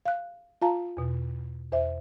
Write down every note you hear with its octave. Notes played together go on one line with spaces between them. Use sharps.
F5 F#6
F4 F5 A5 A#5
E2 B2
E2 C5 E5